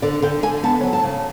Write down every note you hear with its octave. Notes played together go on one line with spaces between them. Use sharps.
D3 D5
D3 G5
D3 G#5
B3 A5
F#3
A5
C#3